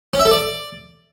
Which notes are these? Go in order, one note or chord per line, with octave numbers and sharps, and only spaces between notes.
C#4
E5
A4
D5